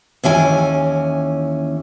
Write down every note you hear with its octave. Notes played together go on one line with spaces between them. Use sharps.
D#2 E3 C#4 G#5